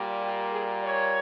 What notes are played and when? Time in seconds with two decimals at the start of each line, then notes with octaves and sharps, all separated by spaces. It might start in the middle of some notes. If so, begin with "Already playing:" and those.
Already playing: A#2 G3 A#3
0.21 G4
0.52 G#4
0.83 C#5